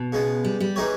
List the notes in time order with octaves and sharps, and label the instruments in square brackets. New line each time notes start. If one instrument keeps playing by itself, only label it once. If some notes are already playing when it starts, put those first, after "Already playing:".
Already playing: [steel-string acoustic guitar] B2
[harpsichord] C#3 G#3 B3
[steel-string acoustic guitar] G3
G3
[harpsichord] E3 G#3 D#4 G4 C#5